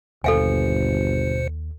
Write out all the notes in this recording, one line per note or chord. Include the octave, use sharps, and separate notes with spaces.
G1 D#2 B2 A4 C5 F5 G#5 C#7